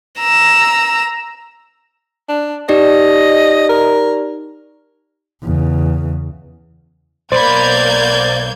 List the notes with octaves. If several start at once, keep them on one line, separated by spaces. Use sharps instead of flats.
A#5 E6
D4
D#4 G4 D5 D#5
A#4
E2 C#3
B1 A#3 C5 D5 B5 G6 G#6